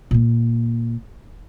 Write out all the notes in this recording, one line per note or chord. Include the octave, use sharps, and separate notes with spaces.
A#2 A#3